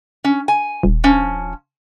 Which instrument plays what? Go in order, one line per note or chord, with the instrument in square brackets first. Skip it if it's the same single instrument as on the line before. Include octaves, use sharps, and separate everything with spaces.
[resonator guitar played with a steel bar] C#4
G#5
[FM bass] D#1
[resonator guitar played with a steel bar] F3 C#4